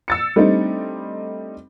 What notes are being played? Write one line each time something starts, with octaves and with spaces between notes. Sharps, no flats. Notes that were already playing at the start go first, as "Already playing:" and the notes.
E6 A6 C#7
G3 A3 C4 D4 D#4